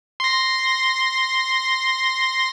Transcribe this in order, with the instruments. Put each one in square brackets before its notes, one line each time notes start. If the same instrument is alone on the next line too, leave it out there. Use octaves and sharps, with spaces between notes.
[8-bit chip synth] C6 A#6